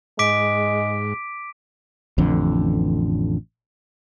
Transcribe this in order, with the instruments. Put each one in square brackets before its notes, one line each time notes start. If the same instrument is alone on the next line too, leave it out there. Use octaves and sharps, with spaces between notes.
[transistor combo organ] G#2 [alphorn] G#3 [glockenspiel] D6 B6 D7
[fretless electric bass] A1 F2 D3